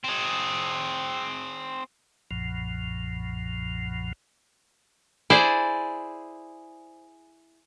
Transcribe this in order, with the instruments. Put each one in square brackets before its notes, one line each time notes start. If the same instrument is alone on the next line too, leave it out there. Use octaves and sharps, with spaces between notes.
[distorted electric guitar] C4 G#4
[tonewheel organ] B1 F#2 A#2 F3
[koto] E4 G#4 C5 D5